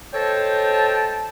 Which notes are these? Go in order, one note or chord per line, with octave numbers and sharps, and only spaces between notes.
A4 C5 C#5 D#5 G5 A5